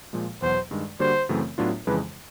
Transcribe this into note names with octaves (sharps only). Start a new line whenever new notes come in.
A#2 F3 G#3
E2 B2 F#3 C5
G2 D#3 G#3
D3 G3 A#3 D4 F#4 C5
F#2 C#3 E3 A3 C4
A2 F#3 B3 D4 F4
F2 C#3 E3 G#3 B4